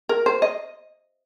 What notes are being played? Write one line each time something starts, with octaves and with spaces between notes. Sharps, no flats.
A#4
C5
D#5